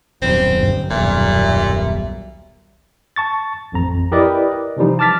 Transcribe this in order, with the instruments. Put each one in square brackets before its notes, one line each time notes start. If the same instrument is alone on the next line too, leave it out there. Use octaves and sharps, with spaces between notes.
[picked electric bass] D#1 B1 F#2 [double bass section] G3 [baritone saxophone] C4
[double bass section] G1
[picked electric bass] D#1 [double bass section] B1 F#2 G3 [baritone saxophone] A#2 [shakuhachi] E5
[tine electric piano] A5 C#6 A6
A1 F2 A#5
E4 G4 A#4 B4 D5 D#5
C3 E3 F3 G3 D#4
A5 D6 F6 A6 B6